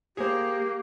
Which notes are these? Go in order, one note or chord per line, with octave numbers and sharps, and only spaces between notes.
A#3 G4 G#4 C5